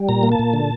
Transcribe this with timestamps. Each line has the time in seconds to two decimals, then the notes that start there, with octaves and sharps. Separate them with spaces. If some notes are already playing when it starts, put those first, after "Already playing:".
Already playing: G3
0.09 A#2 A#5
0.23 A#3
0.32 A5
0.39 A#2
0.53 D3